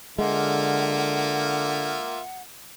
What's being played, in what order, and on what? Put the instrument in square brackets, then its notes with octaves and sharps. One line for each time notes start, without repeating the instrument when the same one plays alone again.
[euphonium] D3 [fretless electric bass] G#3 [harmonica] A#3 F4 E5 [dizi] F#5